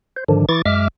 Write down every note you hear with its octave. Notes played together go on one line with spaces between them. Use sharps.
C5
G#2 D3 D#3 F3 D4
E3 E4 C#6 D6 A6
F#2 G#3 E5 D6 F6